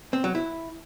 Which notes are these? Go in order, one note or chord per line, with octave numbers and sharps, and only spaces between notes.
C4
F#3
E4